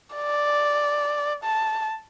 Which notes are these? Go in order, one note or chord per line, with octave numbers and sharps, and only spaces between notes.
D5
A5